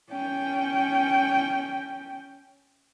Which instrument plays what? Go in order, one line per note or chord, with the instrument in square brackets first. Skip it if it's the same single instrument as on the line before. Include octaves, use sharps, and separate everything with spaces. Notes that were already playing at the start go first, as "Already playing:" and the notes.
[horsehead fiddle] C#4 G5